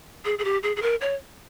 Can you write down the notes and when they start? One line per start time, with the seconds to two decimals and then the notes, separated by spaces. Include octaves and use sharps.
0.25 G#4
0.39 G#4
0.45 G4
0.63 G#4
0.76 G#4
0.82 A#4
1.01 C#5